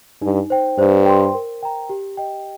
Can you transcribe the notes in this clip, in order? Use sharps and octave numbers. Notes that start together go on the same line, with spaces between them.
G2 D#4
C5 G5
G2 C5
G5 C6
A#4
G5 A#5
G4
D#5 G5